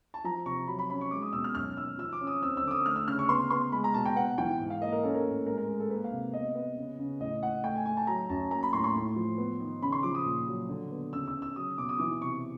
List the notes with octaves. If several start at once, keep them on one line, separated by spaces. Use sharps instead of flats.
A5
F3 A#5
C3 C#6
F#3 B5
B5
C#4 B5
C#6
G#3 D6
D#6
B2 E6
F6
F#2 F6
D#3 E6
F3 E6
D6
C#4
D#6
C4 E6
E6
D3 D6
D#6
A3 F6
E6
C#3 F6
C#6
B3 C6
B3 C6
G#3 B5
A#5
B2 A5
G5
B3 F#5
E3 G5
G#2
F5
A#3 D#5
A#4
C#4 A4
A#4
A2
G#3 A#4
A#4
G#3
A4
A#3 B4
F5
C3
B3 D#5
B3
C#3
C#3
A2 D#5
A2 F#5
A3 G5
G#5
A3 G#5
A5
F#3 A#5
F#2 A5
A#3 A#5
B5
A2 C6
C6
A2
F3
B3
D#3
C#3 B5
C6
F3 D6
D#6
A#2
F#3
D3
B3
C#3 E6
E6
C#3
E6
F#3 D#6
B2 D6
D#6
E3 D6
C3 C#6